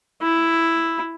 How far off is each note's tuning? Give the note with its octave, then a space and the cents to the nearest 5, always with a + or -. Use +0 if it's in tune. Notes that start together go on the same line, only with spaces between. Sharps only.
E4 +5